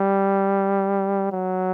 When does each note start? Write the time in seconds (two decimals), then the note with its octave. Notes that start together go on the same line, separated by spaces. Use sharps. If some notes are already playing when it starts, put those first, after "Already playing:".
Already playing: G3
1.32 F#3